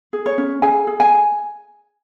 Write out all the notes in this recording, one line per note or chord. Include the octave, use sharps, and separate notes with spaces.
G#4
C#5
C#4
G#4 G#5
G#4
G#5